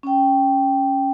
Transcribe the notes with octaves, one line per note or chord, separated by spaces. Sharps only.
C#4 G5